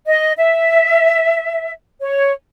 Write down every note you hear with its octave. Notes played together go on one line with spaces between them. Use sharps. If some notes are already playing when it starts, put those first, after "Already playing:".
D#5
E5
C#5